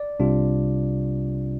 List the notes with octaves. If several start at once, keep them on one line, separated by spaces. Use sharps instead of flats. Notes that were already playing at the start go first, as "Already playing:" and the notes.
Already playing: D5
C2 C3 G3 D4 F4